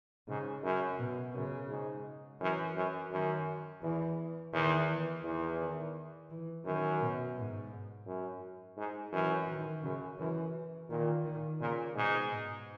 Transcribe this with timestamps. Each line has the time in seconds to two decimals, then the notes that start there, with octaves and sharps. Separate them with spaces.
0.28 G#2 C#3
0.63 F#2
0.99 B2
1.34 F#2 C#3
1.70 G#2
2.40 F#2 E3
2.76 F#2
3.11 F#2 D#3
3.82 E2 E3
4.53 E2 D#3
4.88 E3
5.23 E2 E3
5.59 D#3
6.30 E3
6.64 F#2 D#3
7.01 B2
7.36 G#2
8.06 F#2
8.77 G#2
9.12 F#2 E3
9.47 D#3
9.83 F#2 C#3
10.19 F#2 E3
10.90 A#2 D#3
11.24 D#3
11.61 A#2 C#3
11.95 G#2 B2
12.32 G#2